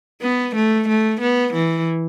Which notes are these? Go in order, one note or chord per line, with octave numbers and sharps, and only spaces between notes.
B3
A3
A3
B3
E3